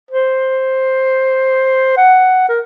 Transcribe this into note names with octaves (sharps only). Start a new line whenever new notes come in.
C5
F#5
A#4